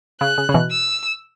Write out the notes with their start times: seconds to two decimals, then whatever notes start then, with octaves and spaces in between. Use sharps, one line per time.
0.20 C#3 F#6
0.38 C#3
0.49 C#3
0.54 B2 E3
0.71 E6